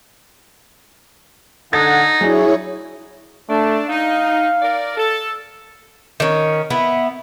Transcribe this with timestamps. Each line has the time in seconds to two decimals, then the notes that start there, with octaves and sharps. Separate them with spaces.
1.73 D3 D#4 A4 F#5 G#6 A6
2.21 F#3 D4 E4 G#4 C#5
3.50 A3 D4
3.90 D#4 F5
4.62 A#4 D5
4.97 A4
6.20 D#3 C#4
6.70 B3 E4